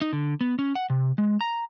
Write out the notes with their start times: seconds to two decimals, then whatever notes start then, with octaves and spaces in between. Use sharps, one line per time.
0.01 D#4
0.13 D3
0.41 B3
0.59 C#4
0.75 F#5
0.90 C3
1.18 G#3
1.41 A#5